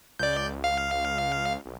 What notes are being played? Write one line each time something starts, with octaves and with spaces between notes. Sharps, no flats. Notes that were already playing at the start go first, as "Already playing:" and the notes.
C#2 D5 G6
F5
B1